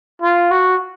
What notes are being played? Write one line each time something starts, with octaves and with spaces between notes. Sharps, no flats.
F4
F#4